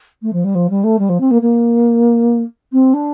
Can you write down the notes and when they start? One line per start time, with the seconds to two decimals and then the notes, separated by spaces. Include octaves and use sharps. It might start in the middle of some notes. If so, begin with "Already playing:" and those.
0.22 A3
0.32 F3
0.44 G3
0.54 F3
0.69 G3
0.83 A3
0.98 G3
1.09 F3
1.20 C4
1.30 A#3
1.41 A#3
2.72 C4
2.93 D4